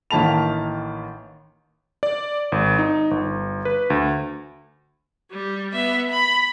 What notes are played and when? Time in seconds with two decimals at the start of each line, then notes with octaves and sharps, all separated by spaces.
0.11 A1 D#3 A#3 A5 B5 F7
2.03 D5
2.52 G#1
2.79 D#4
3.11 G1
3.65 B4
3.90 D2
5.32 G3
5.73 B3 E5
6.11 B5